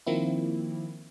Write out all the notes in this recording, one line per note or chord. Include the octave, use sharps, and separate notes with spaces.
D#3 F3 A#3 C4 E4